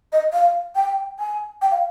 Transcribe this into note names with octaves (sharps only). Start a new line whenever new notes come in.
D#5
F5
G5
G#5
G5
F5